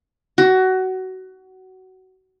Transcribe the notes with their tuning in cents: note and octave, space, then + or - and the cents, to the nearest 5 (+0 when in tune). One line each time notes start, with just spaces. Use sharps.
F#4 +20